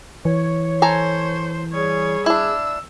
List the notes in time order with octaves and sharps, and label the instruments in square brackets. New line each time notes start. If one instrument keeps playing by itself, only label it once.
[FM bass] E3 [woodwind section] C#5
[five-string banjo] A4 G#5 A#5 [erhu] C5
[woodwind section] G3 G#4 [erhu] C#5
[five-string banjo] D4 E4 [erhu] E6